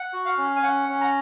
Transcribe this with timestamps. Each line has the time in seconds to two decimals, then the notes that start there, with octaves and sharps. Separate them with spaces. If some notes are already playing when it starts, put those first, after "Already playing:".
Already playing: F#5
0.13 F#4
0.25 F5
0.38 C#4
0.56 G#5
0.63 C#4 F#5
0.89 C#4
1.01 A#5